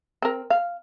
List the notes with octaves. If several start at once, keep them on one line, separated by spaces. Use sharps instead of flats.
C4 A#4
F5